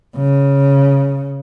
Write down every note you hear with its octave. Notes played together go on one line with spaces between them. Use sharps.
C#3